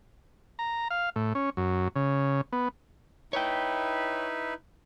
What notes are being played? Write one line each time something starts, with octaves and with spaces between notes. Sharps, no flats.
A#5
F5
A2
C#4
F#2
C#3
B3
D#4 E4 B4 C#5 G5